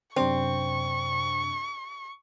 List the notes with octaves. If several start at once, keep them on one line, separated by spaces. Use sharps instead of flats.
F#2 C3 C4 D4 C#6